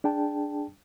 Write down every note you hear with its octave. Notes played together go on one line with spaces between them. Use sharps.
D4 G#4 G5 A5